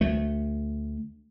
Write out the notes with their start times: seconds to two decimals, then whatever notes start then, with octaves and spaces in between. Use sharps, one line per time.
0.01 D2 A3